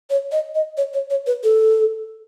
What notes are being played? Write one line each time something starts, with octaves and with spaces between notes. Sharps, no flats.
C#5
D#5
D#5
C#5
C#5
C#5
B4
A4